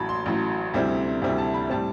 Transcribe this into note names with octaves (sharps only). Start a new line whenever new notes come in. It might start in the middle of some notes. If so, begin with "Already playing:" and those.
Already playing: A1 A2 F#3 A5 B5
C6
A1 A2 F#3
D2 C3 G3 C4 E4
D2 C3 G3 C4 E4
A5
B5
A2 G3 C4 A5